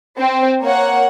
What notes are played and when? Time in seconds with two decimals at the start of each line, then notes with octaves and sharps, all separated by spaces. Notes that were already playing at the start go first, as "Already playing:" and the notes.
0.17 C4 C5
0.60 A#3 C#5 F#5